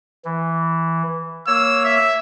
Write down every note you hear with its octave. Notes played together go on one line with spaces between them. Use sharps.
E3
A#3 C#5 E6
E5